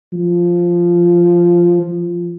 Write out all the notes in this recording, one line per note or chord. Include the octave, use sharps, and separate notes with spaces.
F3
F3